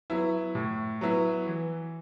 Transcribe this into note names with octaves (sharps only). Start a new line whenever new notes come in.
F#3 B3 E4
A2
F#3 B3 E4
E3